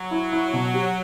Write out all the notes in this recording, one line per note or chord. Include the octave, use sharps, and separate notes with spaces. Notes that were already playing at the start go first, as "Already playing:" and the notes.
Already playing: F#3
E4
E4
B2
G4